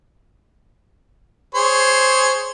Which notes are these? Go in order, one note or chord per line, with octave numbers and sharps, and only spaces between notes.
G#4 C5 C#5